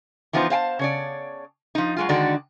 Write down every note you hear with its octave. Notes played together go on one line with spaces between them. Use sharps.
E3 F3 B3 D#4 F4 C5
C5 F5 G5 A5
C#3 C#5 D5
F3 D#4
F#3 G#3 F4
D3 D#3 G#3 F#4 D5